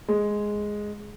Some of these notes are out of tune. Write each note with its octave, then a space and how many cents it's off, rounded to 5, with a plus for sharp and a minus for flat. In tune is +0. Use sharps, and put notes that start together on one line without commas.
G#3 +0